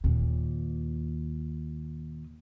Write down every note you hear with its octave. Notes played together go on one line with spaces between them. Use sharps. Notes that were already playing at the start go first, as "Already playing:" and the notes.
D#2 A#2